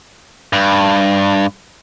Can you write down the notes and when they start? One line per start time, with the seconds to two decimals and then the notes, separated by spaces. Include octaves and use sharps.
0.53 G2